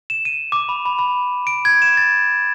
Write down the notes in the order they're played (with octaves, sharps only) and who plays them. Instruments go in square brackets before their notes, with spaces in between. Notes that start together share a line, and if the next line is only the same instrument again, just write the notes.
[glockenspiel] E7
D#7
D6
B5
B5
B5
D7
G#6
E7
A6